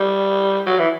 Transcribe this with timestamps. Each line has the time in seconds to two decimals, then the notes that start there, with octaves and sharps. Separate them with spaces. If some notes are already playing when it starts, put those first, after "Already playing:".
Already playing: G3
0.66 F#3
0.79 E3